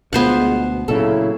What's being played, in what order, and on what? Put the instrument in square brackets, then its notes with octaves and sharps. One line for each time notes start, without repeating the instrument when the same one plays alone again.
[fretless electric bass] D2 B2 [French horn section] G#3 F4 [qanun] B3 C5 F#5
[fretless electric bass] A#2 C#3 [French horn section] F#3 E4 [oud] A4